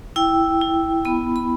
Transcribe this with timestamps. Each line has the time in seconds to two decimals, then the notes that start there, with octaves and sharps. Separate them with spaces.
0.16 E4 G5
0.61 E4
1.05 B3 B5
1.36 B5